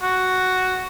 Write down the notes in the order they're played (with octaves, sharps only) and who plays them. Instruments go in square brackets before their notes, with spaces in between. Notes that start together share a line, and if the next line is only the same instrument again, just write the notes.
[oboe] F#4